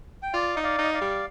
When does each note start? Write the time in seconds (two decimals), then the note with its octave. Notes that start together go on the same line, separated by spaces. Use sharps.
0.23 G5
0.33 F4 D5 F5
0.55 D#4 D#5
0.64 D5 F5
0.78 D#4
0.84 D#5
0.94 D5 F5
1.01 G3